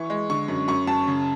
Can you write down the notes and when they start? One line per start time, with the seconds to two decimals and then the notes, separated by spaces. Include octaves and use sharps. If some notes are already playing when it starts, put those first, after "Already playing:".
Already playing: E3 C#6
0.10 G#3
0.30 D3 C#6
0.48 F#2
0.68 F#2 C#6
0.87 F#2 A5
1.07 C#3